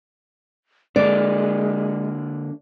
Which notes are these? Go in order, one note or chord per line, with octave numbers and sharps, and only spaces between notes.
D3 G#3 A#3 D4 D5